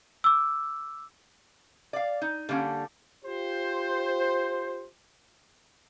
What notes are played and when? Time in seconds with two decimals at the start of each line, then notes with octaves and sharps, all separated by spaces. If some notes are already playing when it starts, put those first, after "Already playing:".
0.24 D6 E6
1.93 D5 F5
2.22 D#4
2.49 D3 G3 A#3 C#4
3.25 F4 G4 C5